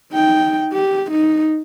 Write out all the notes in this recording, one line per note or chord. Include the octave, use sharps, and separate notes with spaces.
D#4 G5
G4
D#4